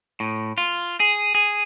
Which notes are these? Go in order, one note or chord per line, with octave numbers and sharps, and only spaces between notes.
A2
F4
G#4
G#4